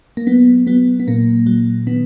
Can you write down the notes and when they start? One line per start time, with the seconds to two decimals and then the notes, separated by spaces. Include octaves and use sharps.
0.17 A#3
0.27 F#3 B3
0.67 F#3 B3
1.00 B3
1.07 A#2 A#3
1.47 F#3
1.87 D#3 B3